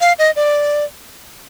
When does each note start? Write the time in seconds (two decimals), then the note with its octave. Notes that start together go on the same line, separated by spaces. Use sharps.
0.01 F5
0.19 D#5
0.36 D5